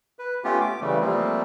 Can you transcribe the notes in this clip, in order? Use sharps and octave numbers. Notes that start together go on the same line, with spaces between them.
B4
A3 B3 C#4 F4 G4
D6
C#3 E3 G3 A3
F3 G3 A3 A#3 C4